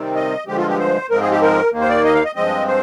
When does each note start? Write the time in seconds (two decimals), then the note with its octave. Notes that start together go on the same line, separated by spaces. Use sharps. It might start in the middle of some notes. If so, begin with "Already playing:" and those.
Already playing: C3 D#3 G3 C4
0.15 D#5
0.47 G2 D3 F3 G#3 G4
0.58 F4
0.69 G4
0.79 C5
1.10 G#2 F3 G#3 C4 A#4
1.21 G#4
1.31 G4
1.42 A#4
1.72 D#2 D#3 A#3
1.81 C5
1.89 D5
2.04 D#5
2.14 F5
2.25 D#5
2.36 G2 F3 G#3 C4 D#5
2.68 C5